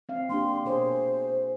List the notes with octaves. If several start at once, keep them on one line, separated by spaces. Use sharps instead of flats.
C4 F5
A#3 D4 G4 C6
B2 G#4 C5 C#5